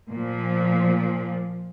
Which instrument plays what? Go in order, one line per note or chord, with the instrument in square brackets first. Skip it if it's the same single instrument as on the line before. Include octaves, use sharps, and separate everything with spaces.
[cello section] A#2 F3